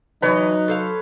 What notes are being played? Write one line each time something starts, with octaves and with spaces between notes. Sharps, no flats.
E3 F#3 D4 D#4 B4 C#5 D#5
A4 C5 F5